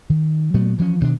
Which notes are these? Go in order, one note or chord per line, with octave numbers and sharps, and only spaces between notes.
D#3
A#2 F#3 A3 B3
E3 F3 A3 C#4
G2 B2 D#3 D4